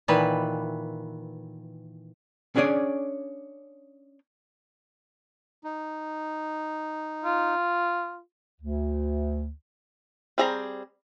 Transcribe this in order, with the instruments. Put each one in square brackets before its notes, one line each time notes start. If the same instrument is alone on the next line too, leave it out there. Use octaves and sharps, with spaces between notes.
[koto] A#2 D#3 E3 B4
[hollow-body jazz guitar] C#4 D4 G#4 C#5 D5
[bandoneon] D#4
[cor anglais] F4
[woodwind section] D2
[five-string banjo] G3 C4 G#4 E5 A#5